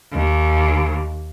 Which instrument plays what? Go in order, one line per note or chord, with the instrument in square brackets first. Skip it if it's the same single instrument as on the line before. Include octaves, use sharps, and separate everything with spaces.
[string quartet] D#2